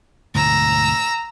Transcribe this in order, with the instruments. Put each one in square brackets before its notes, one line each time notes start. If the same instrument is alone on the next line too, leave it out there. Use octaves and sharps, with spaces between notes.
[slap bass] D2 G#2 B2 [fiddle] A#5 E6